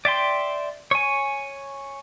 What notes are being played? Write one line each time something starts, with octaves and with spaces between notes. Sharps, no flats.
D5 E5 G5 C6
C#5 G#5